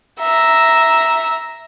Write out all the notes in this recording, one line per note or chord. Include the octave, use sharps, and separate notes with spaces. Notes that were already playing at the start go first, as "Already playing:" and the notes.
E5 A#5